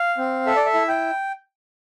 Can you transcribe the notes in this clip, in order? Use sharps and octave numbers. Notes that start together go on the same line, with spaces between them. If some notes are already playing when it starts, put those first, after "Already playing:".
Already playing: F5
C4
A4 E5
D5
E5
E4
G5